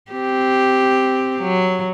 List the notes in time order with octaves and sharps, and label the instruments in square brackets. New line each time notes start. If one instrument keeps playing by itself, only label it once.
[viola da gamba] C4 G4
F#3